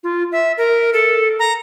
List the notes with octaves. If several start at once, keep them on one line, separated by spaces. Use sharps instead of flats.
F4
E5
A#4
A4
A#5